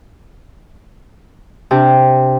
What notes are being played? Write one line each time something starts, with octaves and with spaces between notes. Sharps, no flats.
C3 D4